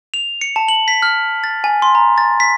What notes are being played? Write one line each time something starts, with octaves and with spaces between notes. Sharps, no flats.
F7
C#7
A5
F#7
B6
F6
A6
G#5
C6
A#5
A6
B6